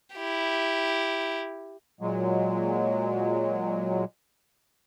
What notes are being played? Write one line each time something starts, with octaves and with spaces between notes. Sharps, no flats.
E4 G4
A#2 F#3 G#3